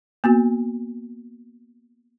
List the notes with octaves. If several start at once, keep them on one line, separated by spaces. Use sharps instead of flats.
A#3 B3 F#4